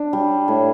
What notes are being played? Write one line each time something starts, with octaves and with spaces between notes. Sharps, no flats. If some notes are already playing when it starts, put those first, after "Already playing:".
Already playing: D4
G3
A2